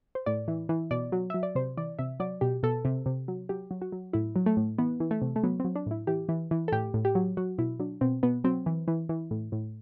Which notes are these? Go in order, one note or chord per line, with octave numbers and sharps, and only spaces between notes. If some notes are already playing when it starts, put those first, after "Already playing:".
C5
A2 D5
E3
E3
B2 D5
F#3
F#3 E5
D5
C3 C5
E3 D5
C3 E5
F#3 D5
B2 G4
B2 A4
C3
C3
F#3
F#3 G4
F#3
F#4
F#3
A2 E4
F#3
A3
A2
E3 B3
E3
A3
C3
A3
F#3 B3
F#3 C4
D4
A2 E4
E3 G4
E3
E3
A4
A2 G4
A2
G4
F#3
F#3 F#4
B2 E4
F#3 D4
B2 C4
B2 B3
F#3 C4
E3
E3
E3
A2
A2